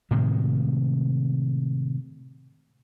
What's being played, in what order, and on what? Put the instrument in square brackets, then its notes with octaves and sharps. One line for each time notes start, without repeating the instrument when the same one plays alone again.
[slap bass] A2 C3 D#3 G#3